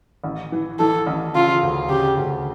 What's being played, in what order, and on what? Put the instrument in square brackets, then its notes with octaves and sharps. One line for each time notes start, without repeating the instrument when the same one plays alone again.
[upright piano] A1
E3
[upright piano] E3 [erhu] A4
[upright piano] A1
[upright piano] C#3 [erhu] F4
[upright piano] D2
[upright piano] C#3 [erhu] G4
[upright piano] D2